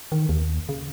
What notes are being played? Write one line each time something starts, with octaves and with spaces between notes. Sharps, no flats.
D#3
D#2
C#3